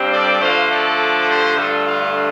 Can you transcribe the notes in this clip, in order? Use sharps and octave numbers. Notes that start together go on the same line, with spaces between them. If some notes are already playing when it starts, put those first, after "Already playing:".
Already playing: G2 G3 C4
A4 D5
D3 F3 A3 C5 F5
A4 D5
G4 C5
G2 D3 A3 F4 A4
F4